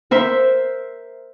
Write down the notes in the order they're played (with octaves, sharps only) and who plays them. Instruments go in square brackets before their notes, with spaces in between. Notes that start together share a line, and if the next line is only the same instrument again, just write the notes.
[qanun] A#4 C5 E5